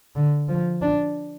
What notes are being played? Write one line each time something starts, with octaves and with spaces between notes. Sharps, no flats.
D3
F3
D4